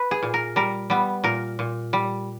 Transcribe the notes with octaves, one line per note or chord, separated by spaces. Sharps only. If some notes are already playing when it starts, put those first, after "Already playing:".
Already playing: B4
G#4
A#2
A#4
G3 A#4
G3 B3
A#2 A#4
A#2
G3